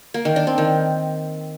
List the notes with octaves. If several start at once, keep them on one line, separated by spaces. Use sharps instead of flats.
A#3
D#3
D4
C4
D#3